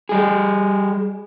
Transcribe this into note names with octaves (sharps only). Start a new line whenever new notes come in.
G3 G#4